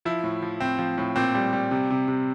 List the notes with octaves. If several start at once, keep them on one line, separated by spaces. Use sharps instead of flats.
F3 E4
A2
F3
A2 C4
F3
A2
A#2 C4
G3
G3
C3
C3
C3